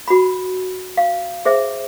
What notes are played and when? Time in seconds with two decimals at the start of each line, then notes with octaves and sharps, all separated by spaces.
0.08 F#4 B5
0.97 F5
1.45 G#4 C5 E5